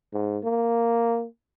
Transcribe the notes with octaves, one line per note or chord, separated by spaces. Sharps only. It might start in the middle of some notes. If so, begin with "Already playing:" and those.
G#2
A#3